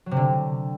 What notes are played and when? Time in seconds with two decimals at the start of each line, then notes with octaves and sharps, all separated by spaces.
0.06 F#3
0.11 C3
0.16 D3